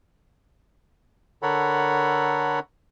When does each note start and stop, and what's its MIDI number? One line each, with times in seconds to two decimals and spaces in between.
1.43 2.59 50
1.43 2.59 69
1.43 2.59 70
1.43 2.59 73
1.43 2.59 78
1.43 2.59 83